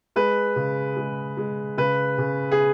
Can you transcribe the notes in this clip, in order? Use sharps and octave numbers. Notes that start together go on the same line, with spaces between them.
G#3 B4
C#3
G#3
G#3
C#3 B4
C#3
G#4